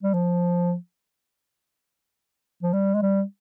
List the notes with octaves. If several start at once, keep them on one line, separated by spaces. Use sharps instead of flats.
G3
F3
F3
G3
G#3
G3